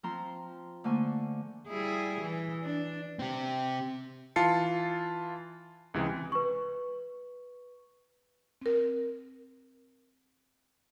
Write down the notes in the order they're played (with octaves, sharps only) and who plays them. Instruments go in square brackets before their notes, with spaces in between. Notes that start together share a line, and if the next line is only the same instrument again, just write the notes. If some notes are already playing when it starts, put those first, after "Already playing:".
[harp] F3 C4 A#5 C6
D3 A3 A#3 C5 G#5 C#6
[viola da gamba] G3 E4 G#4
E3
D4
[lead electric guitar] C4 G4
[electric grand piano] E3 F4 A5 C7 C#7
C#2 C3 E3 G#3
[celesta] B4 C#6
[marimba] C4 A#4